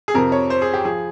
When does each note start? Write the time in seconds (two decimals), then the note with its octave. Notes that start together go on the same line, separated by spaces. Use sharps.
0.08 G#4
0.14 F2 C3 F3 A#4
0.32 C#5
0.50 C5
0.62 G#4
0.74 G4
0.85 F3 G#4